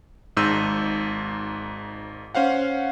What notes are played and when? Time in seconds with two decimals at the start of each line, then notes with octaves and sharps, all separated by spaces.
0.37 G#1 G#2 E6 G6 D#7
2.35 C#4 C5 F5 F#5